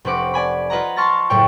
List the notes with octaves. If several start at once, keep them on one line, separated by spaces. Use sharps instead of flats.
F1 C4 C#4 B4 F#5 D6
D5 G#5 B5
F4 B4 D#5 F#5 A#5
A5 C6 C#6 F6 A6 A#6
F#1 A2 C#5 G5